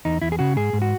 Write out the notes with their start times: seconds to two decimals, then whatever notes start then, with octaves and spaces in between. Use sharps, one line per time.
0.05 E2 D#4
0.22 E2 E4
0.32 G#4
0.39 C#3 F#4
0.56 G#2 G#4
0.73 G#2
0.82 F#4